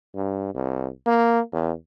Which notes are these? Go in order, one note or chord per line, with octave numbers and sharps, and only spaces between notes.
G2
C2
A#3
E2